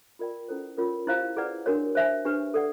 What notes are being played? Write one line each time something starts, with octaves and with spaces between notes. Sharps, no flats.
F4 A#4 D5 G5
C#4 E4 A4 C5
C#4 F4 A#4 C#5
E4 G4 C5 F5 A#5
E4 G#4 B4 D5 F#5
D4 F#4 A#4 C#5
C5 E5 G#5
D4 G4 B4
A4 D5 F#5